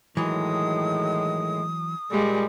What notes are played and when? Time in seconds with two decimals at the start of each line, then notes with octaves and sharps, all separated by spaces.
0.17 A2 D#3 E3 F#3 G#3 D#6
2.11 A#2 G3 G#3